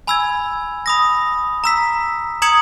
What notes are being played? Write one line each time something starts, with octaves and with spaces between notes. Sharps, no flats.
G#5 B5 E6 G#6
B5 D#6 A#6
A#5 E6 B6
A#5 D#6 G#6 C#7 F#7